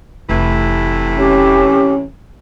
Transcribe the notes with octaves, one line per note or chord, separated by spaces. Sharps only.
F1 A2 C3 E3
C#4 G4